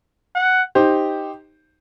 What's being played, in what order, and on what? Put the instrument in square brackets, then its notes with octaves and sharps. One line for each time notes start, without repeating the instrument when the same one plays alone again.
[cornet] F#5
[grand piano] D#4 G4 C5